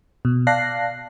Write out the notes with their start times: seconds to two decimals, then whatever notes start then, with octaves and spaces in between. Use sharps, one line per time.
0.25 B2
0.47 D5 F5 A5 F#6 A#6 C7